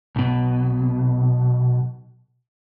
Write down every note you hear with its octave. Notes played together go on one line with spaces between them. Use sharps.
B1 B2